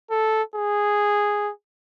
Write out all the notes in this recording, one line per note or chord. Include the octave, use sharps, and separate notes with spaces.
A4
G#4